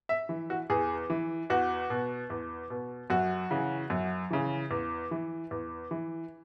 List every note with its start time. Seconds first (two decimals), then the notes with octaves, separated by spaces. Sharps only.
0.09 E5
0.29 E3
0.50 F#4
0.70 E2 G#4
1.10 E3
1.50 E2 F#4
1.90 B2
2.30 E2
2.70 B2
3.10 F#2 F#4
3.51 C#3 E3
3.90 F#2
4.31 C#3 E3
4.71 E2
5.11 E3
5.51 E2
5.91 E3